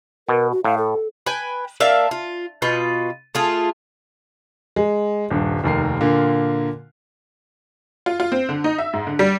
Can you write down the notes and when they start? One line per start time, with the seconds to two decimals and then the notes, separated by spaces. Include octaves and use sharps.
0.29 B2 A#4
0.51 F#4
0.65 A2 F5
0.78 A4
1.26 B4 G5 G#5
1.80 A#3 D4 E5 F5
2.11 F4
2.62 B2 F4 B4 G5
3.35 A3 F4 G#4
4.76 G#3
5.30 D#1 G2
5.64 F1 D#2 A#4 C7
6.01 A#2 D3 A#3 F4
8.06 F4
8.20 F4
8.32 C4
8.49 D3
8.64 D#4
8.78 E5
8.93 G#2
9.07 D3
9.19 G3